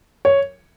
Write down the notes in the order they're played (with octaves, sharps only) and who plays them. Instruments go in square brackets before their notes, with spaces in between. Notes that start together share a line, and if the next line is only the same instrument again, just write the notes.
[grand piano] C#5